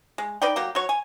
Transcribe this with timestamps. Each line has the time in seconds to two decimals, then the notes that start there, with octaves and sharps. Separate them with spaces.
0.18 G#3
0.42 D#4 B4 D5 G5
0.56 F#3 A#3 G4
0.75 F#3 C#5
0.89 G#5